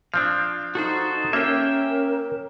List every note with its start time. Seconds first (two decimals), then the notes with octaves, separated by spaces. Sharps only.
0.14 F3 C4 D4 F5
0.75 D#4 F#4 A4 C5
1.33 A#3 C#4 G4 A#4 E5 G5